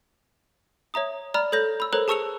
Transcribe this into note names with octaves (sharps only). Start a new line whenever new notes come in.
C#5 E5 A#5 D#6
D5 A#5 B5 F6
A4 C#5 G6 A#6
B5 E6
A4 A#4 C5 C#5 A#5 F#6
G#4 A5 C#6 E6 C#7 F7